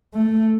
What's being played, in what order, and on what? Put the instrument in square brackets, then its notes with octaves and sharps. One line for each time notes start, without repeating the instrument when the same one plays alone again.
[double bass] A3